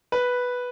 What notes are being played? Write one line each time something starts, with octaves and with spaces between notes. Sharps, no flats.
B4